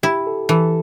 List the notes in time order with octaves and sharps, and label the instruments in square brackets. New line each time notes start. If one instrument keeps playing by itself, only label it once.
[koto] E4 [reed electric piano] G4
[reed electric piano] A4
[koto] E3 [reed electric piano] A4